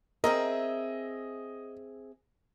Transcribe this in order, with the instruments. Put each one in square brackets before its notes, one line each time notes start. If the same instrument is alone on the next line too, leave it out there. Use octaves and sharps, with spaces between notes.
[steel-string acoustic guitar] C4 G#4 E5 [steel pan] A#4 [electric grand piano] D#5